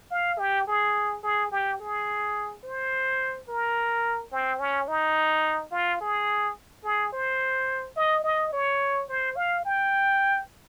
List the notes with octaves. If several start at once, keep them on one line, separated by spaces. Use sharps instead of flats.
F5
G4
G#4
G#4
G4
G#4
C5
A#4
C4
C#4
D#4
F4
G#4
G#4
C5
D#5
D#5
C#5
C5
F5
G5